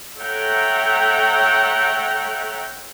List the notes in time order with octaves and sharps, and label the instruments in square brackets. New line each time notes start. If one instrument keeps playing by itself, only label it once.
[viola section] A4 C#5 E5 F#5 G5 A#5